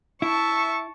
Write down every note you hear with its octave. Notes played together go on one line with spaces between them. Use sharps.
E4 E5 A5 C#6